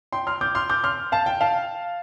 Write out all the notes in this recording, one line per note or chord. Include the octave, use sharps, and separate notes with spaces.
G5 C6
C6 F6
D6 G6
C6 F6
D6 G6
C6 F6
F5 A5
G5
F5 A5